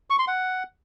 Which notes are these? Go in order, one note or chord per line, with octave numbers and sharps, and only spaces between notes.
C#6
C6
F#5